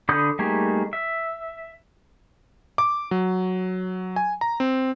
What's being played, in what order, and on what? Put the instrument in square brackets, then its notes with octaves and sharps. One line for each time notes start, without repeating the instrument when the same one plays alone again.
[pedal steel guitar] D3 A4 B5 D#6 G6
G3 A3 A#3 D#4 G#4
E5
[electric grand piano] D6
F#3
G#5
A#5
C4